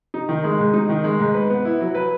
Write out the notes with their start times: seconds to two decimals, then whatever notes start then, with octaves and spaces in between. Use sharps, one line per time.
0.14 D#4
0.29 D#3
0.44 G#3
0.59 G#2
0.74 D#4
0.89 D#3
1.04 G#3
1.20 G#2
1.34 B4
1.50 B3
1.65 E4
1.81 F#3
1.95 B4